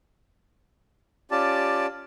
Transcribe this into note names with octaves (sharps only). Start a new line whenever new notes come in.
C#4 F4 G4 D5 A5